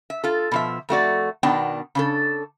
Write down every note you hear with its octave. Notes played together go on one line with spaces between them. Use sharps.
E5
F4 A4
B2 F3 E5
F2 A3 F#4 D5
B2 D#3 B3 D4 G5 A5
C#3 D4 A4